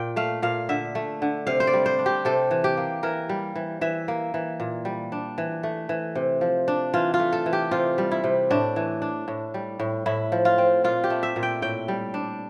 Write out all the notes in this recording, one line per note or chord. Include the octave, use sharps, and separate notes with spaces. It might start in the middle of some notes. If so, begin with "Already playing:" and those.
Already playing: A#2 G5
A3 F5
A#2 F5
D3 E5
A3
D3
C3 F5
C5
D5
G3
C5
D4
G4
C3 A4
E3
G4
A#3
E3 A#4
G3
E3
E3 E5
A#3
E3
A#2
G3
D4
E3
A3
E3
C3
F3
D4
E3 F4
F4
A3
A4
E3
G4
C3 F4
G3
E4
C3
A2 D4
E3
D4
A2
G3
A2
A2 E4
F3
F4
C4
A#2 F4
G4
A3
E5
A#2
G5
A2 G5
G3
D4